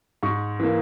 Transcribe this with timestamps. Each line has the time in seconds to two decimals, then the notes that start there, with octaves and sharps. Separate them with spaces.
0.23 G#2 C#6
0.60 E3 A#3